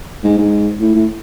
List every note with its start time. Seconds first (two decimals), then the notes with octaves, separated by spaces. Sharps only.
0.23 G#2
0.38 G#2
0.80 A2
0.95 A2